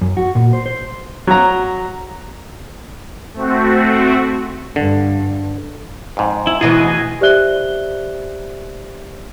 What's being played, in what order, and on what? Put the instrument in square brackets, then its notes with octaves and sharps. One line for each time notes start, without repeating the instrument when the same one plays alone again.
[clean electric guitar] F#2
F#4
A#2
C5
C5
[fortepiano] F#3 A#5
[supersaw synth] A3 C4 F#4
[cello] G2 [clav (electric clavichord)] D3
[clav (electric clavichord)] F2 G#2
[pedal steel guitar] E4
[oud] D2 B2 E3 [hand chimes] E4 [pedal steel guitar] G#4 D#5
[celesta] G4 C5 D5 E5 F#6 G7